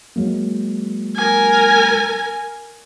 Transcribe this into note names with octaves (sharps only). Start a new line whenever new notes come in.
F#3 G#3 A#3
A#4 G#5